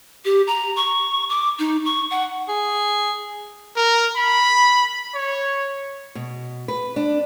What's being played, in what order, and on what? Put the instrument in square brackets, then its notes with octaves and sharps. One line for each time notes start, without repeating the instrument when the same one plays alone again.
[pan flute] G4
A#5
C#6
D6
D#4
C#6
F#5
[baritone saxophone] G#4
[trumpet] A#4
B5
C#5
[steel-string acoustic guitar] B2
B4
D4